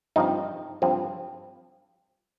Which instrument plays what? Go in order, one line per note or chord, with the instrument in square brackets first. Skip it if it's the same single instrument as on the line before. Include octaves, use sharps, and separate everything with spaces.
[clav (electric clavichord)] G2 F3 C4 D#4
G2 F3 C4